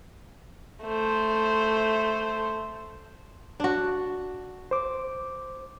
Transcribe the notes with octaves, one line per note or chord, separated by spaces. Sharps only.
A3 C5
D4 F#4
C5 D6